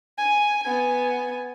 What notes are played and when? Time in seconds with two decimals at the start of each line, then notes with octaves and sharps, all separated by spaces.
0.18 G#5
0.62 B3 G#5